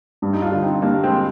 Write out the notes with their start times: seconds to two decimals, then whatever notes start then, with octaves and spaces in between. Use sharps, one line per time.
0.22 G2
0.33 D#4
0.42 D4 F4
0.52 D3
0.62 C4 D#4
0.82 G3 A#3 D4
1.03 G#3 C4